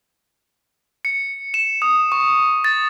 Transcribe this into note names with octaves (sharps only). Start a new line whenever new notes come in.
C#7
E7
D#6
C#6
A6